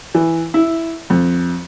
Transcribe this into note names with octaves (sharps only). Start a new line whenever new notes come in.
E3
E4
F2